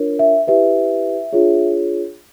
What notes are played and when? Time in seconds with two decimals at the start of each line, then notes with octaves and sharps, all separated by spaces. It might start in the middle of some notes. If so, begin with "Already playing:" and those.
Already playing: D4 F4 A#4 C#5
0.19 E5
0.47 E4 G4 B4 E5
1.33 D4 F4 G#4 C#5